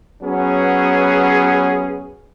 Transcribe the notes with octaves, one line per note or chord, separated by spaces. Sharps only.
F#3 B3 C#4 G#4